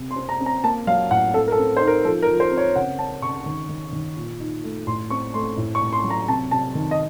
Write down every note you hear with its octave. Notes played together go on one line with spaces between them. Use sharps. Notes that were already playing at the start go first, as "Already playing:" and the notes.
Already playing: C3
C6
C4
A#5
C4
A#5
A#3 A5
F#3 F5
A2 F#5
C4 A4
A#4
A4
C4
D#4 C5
A#4
F3 A4
A#4
F3
C5
C4
C#5
C#3 F#5
C#4 A5
C#3 C#6
D#3
D#3
D#3
A#2
D#4
A3
A2 C6
C4 C#6
A3 C6
A2
C#6
A2
C6
F#3
A#5
C3 A5
C3 A5
D#3
D#5